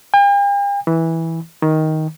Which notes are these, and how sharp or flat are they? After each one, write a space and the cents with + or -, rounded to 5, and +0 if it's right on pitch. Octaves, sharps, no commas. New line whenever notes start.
G5 +45
E3 -10
D#3 +10